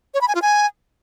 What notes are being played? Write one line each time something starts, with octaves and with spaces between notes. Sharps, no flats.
C#5
B5
G#5
F4
G#5